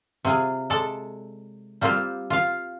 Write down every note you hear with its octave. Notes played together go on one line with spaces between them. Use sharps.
C3 F4 G#4
G#3 A4 D5
G3 A#3 C4 F4 G4
F4 F5